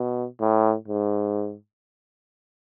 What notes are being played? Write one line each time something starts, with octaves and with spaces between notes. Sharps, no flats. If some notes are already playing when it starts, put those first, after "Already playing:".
Already playing: B2
A2
G#2